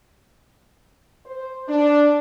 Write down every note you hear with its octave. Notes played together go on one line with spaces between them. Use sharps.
C5
D4